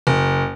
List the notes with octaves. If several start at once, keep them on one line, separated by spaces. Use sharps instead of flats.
F#1